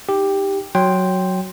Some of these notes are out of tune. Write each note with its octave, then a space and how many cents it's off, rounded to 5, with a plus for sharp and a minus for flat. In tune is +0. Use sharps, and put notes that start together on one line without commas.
D#4 +0 G4 +5
F#3 +0 G5 +0 C6 +0